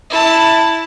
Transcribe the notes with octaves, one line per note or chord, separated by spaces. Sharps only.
E4 A5